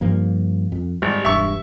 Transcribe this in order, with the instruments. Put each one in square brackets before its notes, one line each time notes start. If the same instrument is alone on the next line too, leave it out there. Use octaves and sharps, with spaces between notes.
[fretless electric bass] G2 F3 A#3
F2
[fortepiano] G#1 [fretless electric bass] G3
[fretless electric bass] E1 G2 [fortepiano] E5 C#6